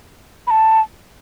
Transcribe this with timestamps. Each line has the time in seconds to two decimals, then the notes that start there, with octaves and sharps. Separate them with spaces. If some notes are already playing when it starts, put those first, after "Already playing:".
0.47 B5
0.51 A5